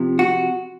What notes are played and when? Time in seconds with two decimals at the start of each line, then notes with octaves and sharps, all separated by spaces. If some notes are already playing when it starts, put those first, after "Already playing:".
Already playing: C3 F3
0.19 F#4